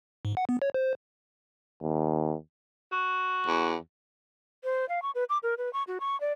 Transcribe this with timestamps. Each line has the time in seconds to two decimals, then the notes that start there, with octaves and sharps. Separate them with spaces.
0.25 G#2
0.37 F#5
0.49 B3
0.62 C#5
0.74 C5
1.82 D#2
2.92 F#4
3.47 E2
4.64 C5
4.89 F5
5.02 C#6
5.15 B4
5.29 D6
5.43 A#4
5.58 B4
5.73 C#6
5.87 F#4
6.00 C#6
6.21 D5